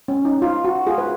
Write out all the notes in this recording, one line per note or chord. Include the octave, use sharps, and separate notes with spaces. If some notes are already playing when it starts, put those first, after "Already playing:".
C#4
D#4
F4
F#4
F4 G#4
B4